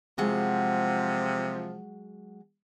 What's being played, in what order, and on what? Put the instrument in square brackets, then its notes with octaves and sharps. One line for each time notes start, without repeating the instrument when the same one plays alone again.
[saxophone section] C3 F3 [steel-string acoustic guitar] F#3 G#3 F#5